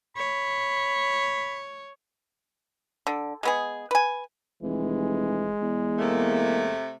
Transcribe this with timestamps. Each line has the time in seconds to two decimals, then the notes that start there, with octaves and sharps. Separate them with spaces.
0.17 C#5 B5
3.07 D3
3.43 G#3 B3 G#4
3.91 B4 G#5
4.63 F1 E3 G#3
5.62 E2
5.98 C3 A3 A#3